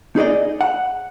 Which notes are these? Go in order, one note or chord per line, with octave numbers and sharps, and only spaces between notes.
D#4 G#4 D5 D#5
F#5